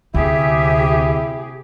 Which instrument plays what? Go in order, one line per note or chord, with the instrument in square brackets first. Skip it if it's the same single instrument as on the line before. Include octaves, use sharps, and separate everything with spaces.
[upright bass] D2 [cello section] C3 G4 G#4 [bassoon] E4 [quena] E5